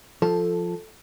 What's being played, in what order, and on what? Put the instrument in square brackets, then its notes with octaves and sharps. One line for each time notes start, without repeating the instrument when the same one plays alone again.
[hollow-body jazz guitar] F3 [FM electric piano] A4